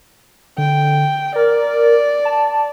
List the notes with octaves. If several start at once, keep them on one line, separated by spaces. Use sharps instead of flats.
D3 G5
A#4 D5
A5